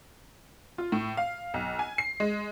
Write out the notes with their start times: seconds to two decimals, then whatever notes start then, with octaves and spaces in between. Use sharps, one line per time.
0.78 F4
0.92 A2
1.17 F5
1.54 B1
1.79 G#5
1.98 C7
2.20 G#3